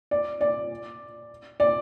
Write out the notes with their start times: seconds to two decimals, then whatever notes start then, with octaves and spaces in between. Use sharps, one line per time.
0.11 D5
0.41 D5
1.60 D5